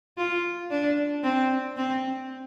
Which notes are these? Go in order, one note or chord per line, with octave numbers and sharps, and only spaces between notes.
F4
D4
C4
C4